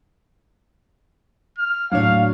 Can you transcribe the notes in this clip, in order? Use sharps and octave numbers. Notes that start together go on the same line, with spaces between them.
F6
D#2 A2 F#3 D4 C#5 F5